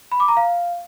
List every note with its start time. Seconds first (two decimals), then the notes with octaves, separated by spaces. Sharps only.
0.12 B5
0.20 D6
0.28 A#5
0.37 F5